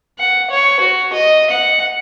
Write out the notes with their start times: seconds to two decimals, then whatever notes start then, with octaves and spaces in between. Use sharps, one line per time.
0.19 F#5
0.51 C#5
0.80 F#4
1.13 D#5
1.51 F#5